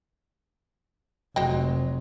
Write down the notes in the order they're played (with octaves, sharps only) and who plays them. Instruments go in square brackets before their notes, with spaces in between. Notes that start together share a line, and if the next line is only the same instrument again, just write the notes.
[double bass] F1 [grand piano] F#3 G#3 [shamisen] C5 D#5 G5